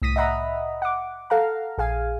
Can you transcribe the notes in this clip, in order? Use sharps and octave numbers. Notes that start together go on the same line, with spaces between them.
C2 A2 D#6 A#6 B6 D#7
D#5 E5 F#5 A#5 B5 D#6
F#5 D6
A4 F5 F#5 A#5
A#1 G#4 F5 G#5